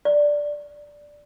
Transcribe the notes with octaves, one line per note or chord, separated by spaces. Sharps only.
D5